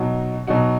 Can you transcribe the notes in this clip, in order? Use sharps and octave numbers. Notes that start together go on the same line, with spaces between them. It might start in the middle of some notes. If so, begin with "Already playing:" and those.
Already playing: B2 F#3 D#4 F#4
B2 F#3 D#4 F#4